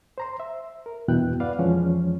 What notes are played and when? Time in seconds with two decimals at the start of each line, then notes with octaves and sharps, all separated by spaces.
0.18 C5 A#5 C6
0.40 E5
0.86 A#4
1.08 E2 G2 B2 E4 G5 F#6
1.40 B4 D5 F5 F#5
1.59 F2 E3 F3 G#3 C#4 C#5